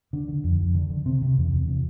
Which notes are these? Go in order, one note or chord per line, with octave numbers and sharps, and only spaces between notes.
D3 D4
D3
F2
F2
D3
D3
C3 C4
C3
E2
E2
C3